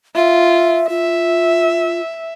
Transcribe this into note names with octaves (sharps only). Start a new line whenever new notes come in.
F4 E5
F4 E5